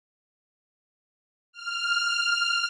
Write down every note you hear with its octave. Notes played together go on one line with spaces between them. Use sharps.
F6